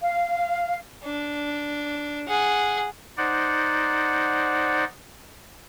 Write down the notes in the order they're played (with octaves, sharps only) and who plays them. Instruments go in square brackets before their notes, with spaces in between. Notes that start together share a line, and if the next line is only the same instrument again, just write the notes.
[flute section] F5
[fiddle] D4
G#4 F#5
[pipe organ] D#4 C5 D5 F#5